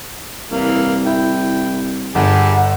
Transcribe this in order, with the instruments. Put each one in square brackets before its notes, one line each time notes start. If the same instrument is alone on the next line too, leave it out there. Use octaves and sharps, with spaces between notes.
[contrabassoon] C2 [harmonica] E3 A#3
[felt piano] E4 [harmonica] G5
[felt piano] G1 [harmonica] G4 G#4 A5 [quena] F#5